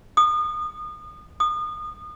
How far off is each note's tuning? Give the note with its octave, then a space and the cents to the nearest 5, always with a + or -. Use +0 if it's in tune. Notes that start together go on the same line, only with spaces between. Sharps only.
D#6 -30
D#6 -30